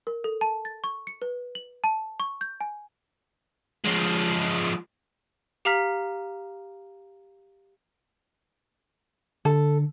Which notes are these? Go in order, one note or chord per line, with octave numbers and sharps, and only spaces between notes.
A#4
A4
A5
A6
C#6
C#7
B4
F#7
A5
C#6
G6
G#5
F3 G#3
G4 F5 A#5 F6 B6
D3 A4